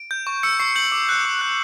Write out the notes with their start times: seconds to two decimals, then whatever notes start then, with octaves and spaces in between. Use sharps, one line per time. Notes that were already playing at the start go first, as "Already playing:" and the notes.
Already playing: D7
0.11 G6
0.27 C#6
0.43 E6 C#7
0.60 C#6 C7
0.75 G6 F#7
0.92 D6
1.09 F#6
1.25 D6
1.41 F#6